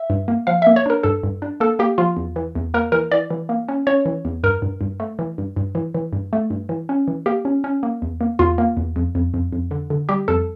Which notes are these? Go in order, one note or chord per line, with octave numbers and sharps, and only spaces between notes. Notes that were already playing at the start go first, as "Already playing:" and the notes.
Already playing: E5
G2
A#3
F3 F5
A#3 E5
C#5
D4 A#4
G2 A4
G2
D4
A#3 A4
A#3 G4
F3 F4
E2
E3
E2
A#3 A#4
E3 A#4
E3 D5
E3
A#3
C#4
C#4 C#5
E3
E2
G2 A#4
G2
G2
A3
E3
G2
G2
E3
E3
G2
A3
G2
E3
C#4
E3
A#3 G4
C#4
C#4
A#3
E2
A#3
E2 F4
A#3
E2
F2
F2
F2
F2
D3
D3
G3 G4
F2 A4